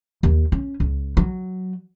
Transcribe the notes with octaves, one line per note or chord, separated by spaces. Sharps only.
D#2
C#4
C#2
F#3